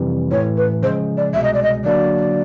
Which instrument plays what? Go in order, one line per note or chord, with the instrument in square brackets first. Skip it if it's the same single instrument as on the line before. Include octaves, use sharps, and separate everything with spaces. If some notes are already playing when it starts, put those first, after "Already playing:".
Already playing: [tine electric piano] F2 C3 E3 G3
[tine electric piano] A2 E3 A3 [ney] C#5
[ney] B4
[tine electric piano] C#3 F3 G#3 [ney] C5
[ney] D5
[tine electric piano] C2 B2 G#3 [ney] E5
[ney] D#5
D5
D#5
[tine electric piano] D3 F#3 A#3 D4 F#4 [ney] D5